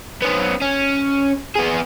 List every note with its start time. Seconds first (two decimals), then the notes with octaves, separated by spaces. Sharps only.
0.22 B3 C#4
0.62 C#4
1.55 B3 G#4